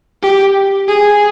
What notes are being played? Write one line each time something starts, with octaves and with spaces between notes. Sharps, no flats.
G4
G#4